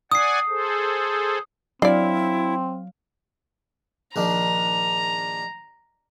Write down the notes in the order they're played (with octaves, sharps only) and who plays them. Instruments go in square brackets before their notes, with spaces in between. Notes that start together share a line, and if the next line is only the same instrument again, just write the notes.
[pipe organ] D5 F#5 G#5 [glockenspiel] D#6 C7
[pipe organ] G#4 A4 C5
[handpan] F#3 F5 [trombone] C4 [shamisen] D4 D5 [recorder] E4
[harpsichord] A#1 D#3 D4 [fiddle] A#5